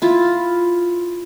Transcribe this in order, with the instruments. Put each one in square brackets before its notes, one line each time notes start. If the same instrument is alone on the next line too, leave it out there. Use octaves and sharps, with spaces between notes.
[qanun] E4 F4